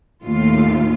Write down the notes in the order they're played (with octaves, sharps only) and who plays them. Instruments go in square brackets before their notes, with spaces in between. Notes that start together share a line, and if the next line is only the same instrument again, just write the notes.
[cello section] D#2 A2 F4